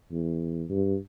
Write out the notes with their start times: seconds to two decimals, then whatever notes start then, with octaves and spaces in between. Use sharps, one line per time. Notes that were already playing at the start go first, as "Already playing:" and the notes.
0.11 E2
0.70 G2